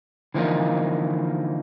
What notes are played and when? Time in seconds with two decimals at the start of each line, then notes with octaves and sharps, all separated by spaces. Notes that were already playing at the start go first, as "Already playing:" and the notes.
0.34 D3 E3 F3 A#3 D#4